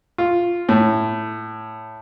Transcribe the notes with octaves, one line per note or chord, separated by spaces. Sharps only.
F4
A2